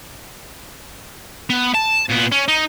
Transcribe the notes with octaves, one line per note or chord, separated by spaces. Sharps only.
B3
A5
A#2 B3
C#4
D#4